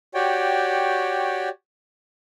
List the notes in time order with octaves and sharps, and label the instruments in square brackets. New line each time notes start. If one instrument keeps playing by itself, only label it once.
[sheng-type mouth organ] F#4 G4 C#5 D5 G5